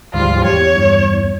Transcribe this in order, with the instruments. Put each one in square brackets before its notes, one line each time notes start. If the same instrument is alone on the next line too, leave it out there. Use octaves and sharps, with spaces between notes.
[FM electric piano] D2 [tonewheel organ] G#2 F3 G3 [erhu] F4
[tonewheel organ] E2 [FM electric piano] G4 [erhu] C#5
[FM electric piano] G2